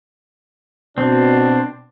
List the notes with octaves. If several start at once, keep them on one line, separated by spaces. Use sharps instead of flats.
B2 C4 D4